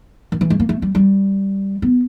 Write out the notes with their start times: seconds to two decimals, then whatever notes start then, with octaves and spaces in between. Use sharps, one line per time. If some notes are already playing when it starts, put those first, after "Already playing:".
0.32 D#3
0.41 E3
0.50 G#3
0.60 A#3
0.69 A3
0.82 G3
0.95 G3
1.82 B3